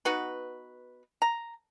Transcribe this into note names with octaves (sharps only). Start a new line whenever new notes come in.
B3 D#4 F#4 B4
A#5